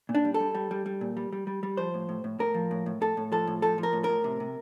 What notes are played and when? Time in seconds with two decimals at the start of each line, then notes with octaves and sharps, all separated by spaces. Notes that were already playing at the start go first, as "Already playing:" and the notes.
0.09 A#2
0.15 D4
0.25 G3
0.34 A4
0.40 G3
0.55 G3
0.71 G3
0.86 G3
1.01 A#2
1.17 G3
1.33 G3
1.47 G3
1.63 G3
1.77 F3 C5
1.94 A2
2.09 A2
2.24 A2
2.39 A2 A#4
2.54 F3
2.71 A2
2.86 A2
3.01 A2 A4
3.17 A2
3.32 F3 A4
3.47 A2
3.62 F3 A4
3.78 F3
3.83 A#4
3.93 A2
4.04 A2 A#4
4.24 C3
4.40 C3